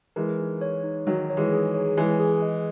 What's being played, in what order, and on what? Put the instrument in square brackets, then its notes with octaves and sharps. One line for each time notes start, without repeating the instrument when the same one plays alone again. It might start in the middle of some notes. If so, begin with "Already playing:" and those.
[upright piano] E3 G#3 [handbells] A#4
[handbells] D#4
C#5
D#4
[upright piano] D#3 F#3 [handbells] D#4
[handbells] C#5
[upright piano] E3 G#3
[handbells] G#4
C#5
[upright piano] E3 G#3 [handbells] G#5
[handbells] G#4
D#5